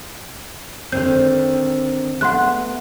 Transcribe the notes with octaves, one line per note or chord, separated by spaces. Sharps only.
D3 D#3 C4 G6
A3 B3 F#5 C6 F#6